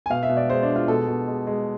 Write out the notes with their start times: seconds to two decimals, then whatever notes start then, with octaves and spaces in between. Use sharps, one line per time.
0.06 G#5
0.10 B2 F5
0.23 E5
0.29 B2
0.37 D5
0.49 G#3 C5
0.63 D4
0.69 G#3
0.76 F4
0.88 B2 A4
1.08 B2
1.28 G#3
1.47 G#3